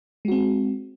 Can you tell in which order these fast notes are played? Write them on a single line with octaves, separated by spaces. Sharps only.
G#3 F#4 C4